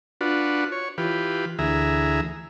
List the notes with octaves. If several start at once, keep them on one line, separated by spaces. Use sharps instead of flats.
D4 F4 F#4 B4
C#5
E3 F4 G4 B4
D2 E3 G#4 E5 A#5